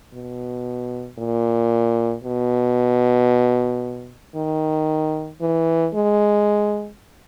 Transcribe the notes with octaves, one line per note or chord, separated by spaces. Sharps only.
B2
A#2
B2
D#3
E3
G#3